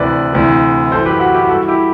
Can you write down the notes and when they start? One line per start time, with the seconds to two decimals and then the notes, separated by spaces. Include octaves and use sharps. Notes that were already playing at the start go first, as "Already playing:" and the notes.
Already playing: D2 C3 E3 B4 D5
0.33 D2 C3 E3
0.92 F#2 E3 A4 C5
1.06 G4 B4
1.20 F#4
1.34 E4 G4
1.49 G2 E3 F#4 A4
1.68 E4 G4